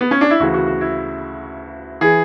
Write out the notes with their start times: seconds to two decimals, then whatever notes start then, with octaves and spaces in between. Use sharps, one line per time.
0.01 B3
0.11 C#4
0.21 D4
0.30 E4
0.40 D2 C#3 E3 F#4
0.54 F#4
0.67 F#4
0.81 E4
2.01 E3 G#4